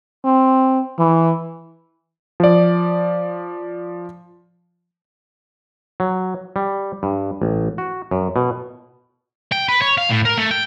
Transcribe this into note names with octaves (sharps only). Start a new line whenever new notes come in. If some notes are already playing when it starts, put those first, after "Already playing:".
C4
E3
F3 D5
F#3
G3
G2
A1
F#4
F#2
B2
G5
B4
C#5
F5
A2
A#4
A3
G5